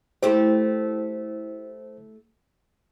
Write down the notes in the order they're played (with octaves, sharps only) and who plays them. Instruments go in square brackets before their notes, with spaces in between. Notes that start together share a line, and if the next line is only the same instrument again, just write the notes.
[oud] A3 E4 G4 [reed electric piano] C5